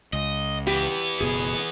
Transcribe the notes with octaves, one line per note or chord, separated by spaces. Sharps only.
C#2 D#5
E3 B3 G4
F#1 B2 G#4